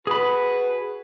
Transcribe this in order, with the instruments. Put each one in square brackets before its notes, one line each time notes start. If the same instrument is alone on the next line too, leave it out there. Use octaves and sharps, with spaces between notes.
[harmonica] F#4 B4 [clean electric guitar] G#4 B5